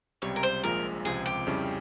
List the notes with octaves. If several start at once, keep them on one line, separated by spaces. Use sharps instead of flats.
C#2 C3 G3 C#5
A#4
C5
A#1 A#2 F3 G#3 A#4
C#2 C3 F3 C4 G#4
G4
F2 C#3 G3 C#4 E4